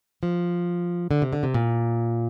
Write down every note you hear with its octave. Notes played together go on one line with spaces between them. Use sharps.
F3
D3
C3
D3
C3
A#2